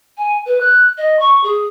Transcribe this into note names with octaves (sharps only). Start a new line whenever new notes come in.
G#5
B4
F#6
D#5
C#6
G#4